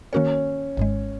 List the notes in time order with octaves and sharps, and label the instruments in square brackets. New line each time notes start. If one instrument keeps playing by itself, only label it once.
[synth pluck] D#3 A#3 F#4 A#4 C#5 [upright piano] C#4
[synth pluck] G#1 G#2 G#3